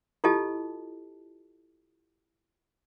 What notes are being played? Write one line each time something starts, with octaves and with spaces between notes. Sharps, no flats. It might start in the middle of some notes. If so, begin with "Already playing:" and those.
E4 F4 G4 A4 D#5 A5